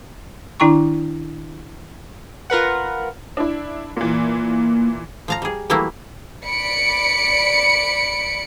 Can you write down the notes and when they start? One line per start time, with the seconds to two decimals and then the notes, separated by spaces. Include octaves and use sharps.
0.60 D#3 D4 E4 G5 A#5 C#6
2.50 F4 A#4 B4 F#5
3.37 D4 E4
3.97 A#2 E3 A#3
5.28 F3 F5 A#5
5.42 G3 G#4
5.70 E3 F#3 G3 A3 A#3 E4
6.46 D5 B5 C#7 D7